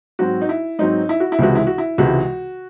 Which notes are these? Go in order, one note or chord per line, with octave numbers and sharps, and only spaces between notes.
G#2 F#3 C4 F#4
D#4
E4
G#2 F#3 C4 D#4
E4
F#4
E4
C#2 C3 E3 G#3 F#4
E4
F#4
E4
C#2 C3 E3 G#3 F#4